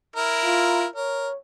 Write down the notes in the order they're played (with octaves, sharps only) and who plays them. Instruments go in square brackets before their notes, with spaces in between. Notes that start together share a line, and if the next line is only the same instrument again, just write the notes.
[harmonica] E4 A#4
[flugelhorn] F4
[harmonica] A#4 [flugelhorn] C#5